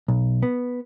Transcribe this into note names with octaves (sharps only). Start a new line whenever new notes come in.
B1
B3